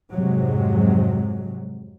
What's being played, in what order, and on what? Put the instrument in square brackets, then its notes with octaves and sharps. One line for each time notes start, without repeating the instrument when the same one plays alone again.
[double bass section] F2 G#2 C3 F#3 G#3